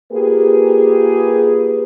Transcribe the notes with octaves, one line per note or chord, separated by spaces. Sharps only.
A#3 F4 G4 G#4 A#4 B4